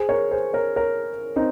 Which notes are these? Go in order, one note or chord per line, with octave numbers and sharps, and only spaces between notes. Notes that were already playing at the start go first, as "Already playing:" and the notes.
Already playing: G#4 C5
A#4 C#5
G#4 C5
A#4 C#5
A#4 C#5
C4 D#4